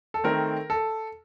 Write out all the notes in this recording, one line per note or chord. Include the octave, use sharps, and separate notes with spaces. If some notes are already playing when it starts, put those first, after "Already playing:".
A4
D#3 A3 C4 A#4
A4